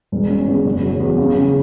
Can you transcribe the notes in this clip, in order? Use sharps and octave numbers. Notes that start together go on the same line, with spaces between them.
E1
C#4
E2
F#1
F#3
E2
C#3
C#3